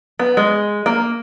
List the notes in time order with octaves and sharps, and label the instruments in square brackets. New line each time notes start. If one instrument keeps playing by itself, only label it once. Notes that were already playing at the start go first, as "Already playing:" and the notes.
[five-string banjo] B3
G#3
A#3